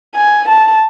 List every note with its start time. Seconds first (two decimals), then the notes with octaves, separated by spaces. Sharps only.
0.16 G#5
0.49 A5